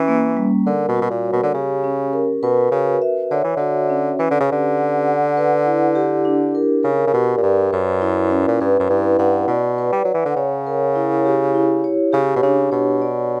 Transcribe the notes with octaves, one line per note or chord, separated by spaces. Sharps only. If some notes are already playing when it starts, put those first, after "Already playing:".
Already playing: E3 C#4
A#3
G3
D3 A#4
B2
F#4
B2
A#2
C#5
B2
D3
C#3 G4
C#4
A#4
B2 B4
C#3 F#4
E5
D3 C#5
E3
D3 F#4
C#4
E3 B4
D3
C#3
D3 G4
F#5
F#5
B4
E4
G4
D4
A#4
C#3 A#4
C#3
B2 G4
A#2
G2 D5
F#2 B4
E4
C#4
A#2
G2 B4
F#2
G2 E4
G2 F#5
B2 D5
B4
G3
F#3 F#5
E3
D3
C#3 C#5
A#4
E4
G4
E4
C#5
C#3 G4
B2
C#3 D4
B2 C#5
D5